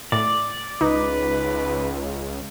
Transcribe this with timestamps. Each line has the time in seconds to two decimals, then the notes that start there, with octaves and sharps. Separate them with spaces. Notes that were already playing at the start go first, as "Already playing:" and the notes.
0.12 A2 D5
0.81 C#2 D#4 B4